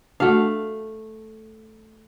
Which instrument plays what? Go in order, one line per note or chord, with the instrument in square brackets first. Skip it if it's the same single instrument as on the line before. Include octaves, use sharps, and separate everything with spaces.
[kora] A3 F5 [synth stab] D4 F#4